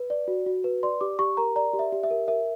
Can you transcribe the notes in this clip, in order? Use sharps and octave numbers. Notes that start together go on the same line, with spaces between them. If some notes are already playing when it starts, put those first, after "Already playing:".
Already playing: B4
D5
F#4
F#4
B4
D5 C6
G4 D6
G4 C#6
A#4 A#5
D5 A#5
G4
E5
G4
E5
A#4
A#4 E5